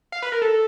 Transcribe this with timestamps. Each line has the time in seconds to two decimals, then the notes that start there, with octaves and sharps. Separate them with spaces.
0.12 F5
0.22 B4
0.32 A#4
0.42 A4